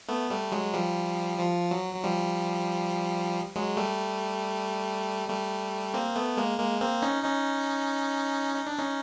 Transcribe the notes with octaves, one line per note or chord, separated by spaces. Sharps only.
A3 B3
G3 A3
F#3 G#3
F3 G3
F3
F#3
F#3
F3 G3
F#3 G#3
G3 A3
G3 A3
A#3 C4
A3 B3
G#3 A#3
G#3 A#3
A#3 C4
C#4 D#4
C#4 D#4
D#4
D4
C#4 D#4